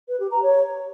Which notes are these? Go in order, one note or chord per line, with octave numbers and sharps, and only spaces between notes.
B4
G4
A#5
C#5